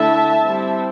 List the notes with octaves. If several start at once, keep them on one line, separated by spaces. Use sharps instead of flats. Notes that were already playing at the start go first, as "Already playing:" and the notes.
Already playing: D3 A3 E4 E5 A5
G3 C4 E4